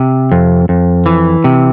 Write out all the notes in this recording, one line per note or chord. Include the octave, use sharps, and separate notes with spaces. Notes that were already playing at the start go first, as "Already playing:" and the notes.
Already playing: C3
F2
F2
E3
C3